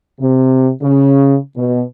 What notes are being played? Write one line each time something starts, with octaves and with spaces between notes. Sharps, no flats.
C3
C#3
B2